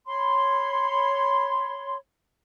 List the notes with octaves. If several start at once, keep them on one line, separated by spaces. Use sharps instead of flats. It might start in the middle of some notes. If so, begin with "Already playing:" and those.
C#5 B5 C6